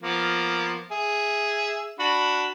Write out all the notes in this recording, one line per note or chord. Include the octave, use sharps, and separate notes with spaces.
F3 A#3 B3
G#4 E5
D4 F#4 B5